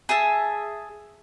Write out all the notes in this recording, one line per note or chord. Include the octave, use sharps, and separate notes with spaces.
G#4 E5 A5